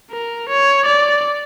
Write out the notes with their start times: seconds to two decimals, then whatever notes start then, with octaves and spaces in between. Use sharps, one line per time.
0.12 A#4
0.49 C#5
0.86 D5